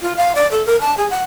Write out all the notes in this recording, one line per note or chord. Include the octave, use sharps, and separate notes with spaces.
F4
F5
D5
A4
A#4
A5
G#4
F#5